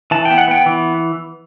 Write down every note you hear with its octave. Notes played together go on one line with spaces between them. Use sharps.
E3 A5
G5
B3
F#5
B3 G5
E3